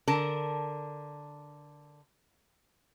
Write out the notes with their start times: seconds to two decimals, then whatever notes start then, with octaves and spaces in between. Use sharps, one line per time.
0.08 D3 A#4 A5